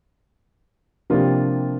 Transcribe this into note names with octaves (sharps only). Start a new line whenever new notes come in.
C3 F3 A#3 D4 F4 G4